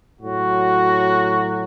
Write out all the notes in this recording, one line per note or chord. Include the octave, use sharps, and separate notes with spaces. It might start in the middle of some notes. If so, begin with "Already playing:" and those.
A2 F#3 F#4